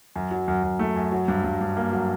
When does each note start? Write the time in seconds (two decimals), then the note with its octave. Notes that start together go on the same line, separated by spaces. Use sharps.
0.16 F#2
0.31 F#3
0.48 F#2
0.63 F#2
0.79 A3
0.96 F#2
1.12 F#3
1.28 G2
1.44 G2
1.61 G2
1.77 A#3
1.92 F#3